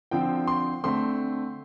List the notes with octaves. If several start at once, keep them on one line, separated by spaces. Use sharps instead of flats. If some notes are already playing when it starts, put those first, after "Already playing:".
D3 F3 C4 G5
C6
D3 A3 C4 C6